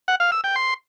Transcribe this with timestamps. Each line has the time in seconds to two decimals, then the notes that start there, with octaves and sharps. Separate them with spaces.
0.08 F#5
0.20 F5
0.32 E6
0.44 G5
0.56 C6